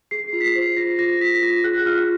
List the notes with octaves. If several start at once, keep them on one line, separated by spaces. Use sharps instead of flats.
G#4 C7
F4
B6
C7
C5
F4 A#6
F4 A#6
F4 B6
B6
F4 A#6
G#4 F#6
F4 F6